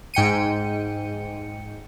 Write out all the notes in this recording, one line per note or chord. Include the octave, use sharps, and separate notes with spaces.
G#2 G5 C#7 D#7